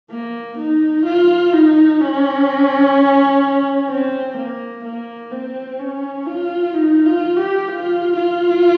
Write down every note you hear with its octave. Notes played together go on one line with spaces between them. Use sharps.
A#3
D#4
F4
D#4
C#4
C4
A#3
A#3
C4
C#4
F4
D#4
F4
G4
F4
F4